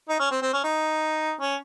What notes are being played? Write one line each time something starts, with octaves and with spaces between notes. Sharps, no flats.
D#4
C#4
C4
C4
C#4
D#4
C#4